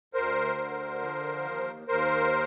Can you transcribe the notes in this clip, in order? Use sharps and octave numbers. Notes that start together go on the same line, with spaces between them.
D2 A#4 C5
D3
F3
D#2
D#2 A#4 C5